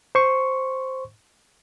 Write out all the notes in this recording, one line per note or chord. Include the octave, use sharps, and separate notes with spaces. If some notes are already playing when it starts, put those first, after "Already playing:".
C5 C6 C#6